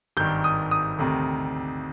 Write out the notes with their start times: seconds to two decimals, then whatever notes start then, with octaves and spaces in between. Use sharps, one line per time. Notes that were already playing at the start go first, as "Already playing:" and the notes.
0.17 G#1 G2 D#3 G6
0.44 D#6
0.71 D#6
0.99 D2 C3 D#3